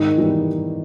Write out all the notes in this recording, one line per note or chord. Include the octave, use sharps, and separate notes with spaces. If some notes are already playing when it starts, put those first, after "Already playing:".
Already playing: G#2 D#3 D#4
E3 G3 B3